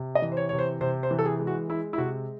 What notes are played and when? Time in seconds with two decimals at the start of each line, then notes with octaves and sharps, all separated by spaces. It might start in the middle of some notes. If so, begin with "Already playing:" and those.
Already playing: C3
0.15 D#5
0.22 E3
0.32 C5
0.37 C#5
0.49 C3 C#5
0.59 C5
0.81 C3 C5
1.03 C5
1.11 E3
1.19 A4
1.26 G#4
1.39 G#3
1.47 F#4
1.68 G#3 E4
1.93 E4
1.98 C3 F#4